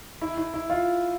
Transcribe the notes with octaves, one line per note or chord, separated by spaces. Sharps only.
E4
E4
E4
F4